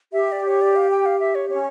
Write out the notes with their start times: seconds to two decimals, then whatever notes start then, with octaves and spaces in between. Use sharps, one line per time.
0.12 G4 E5
0.32 D5
0.47 C#5
0.61 D5
0.76 F5
0.91 G5
1.06 F5
1.20 E5
1.35 C#5
1.49 C#4 C#5